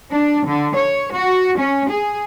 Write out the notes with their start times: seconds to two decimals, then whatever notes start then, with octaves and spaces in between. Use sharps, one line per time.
0.11 D4
0.46 D3
0.76 C#5
1.15 F#4
1.58 C#4
1.90 G#4